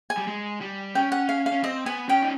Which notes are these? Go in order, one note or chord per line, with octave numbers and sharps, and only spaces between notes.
G#5
G3
G#3
G3
C#4 G5
F#5
F5
F5
C#4
C4 D#5
B3 G#5
C#4 G5
D#4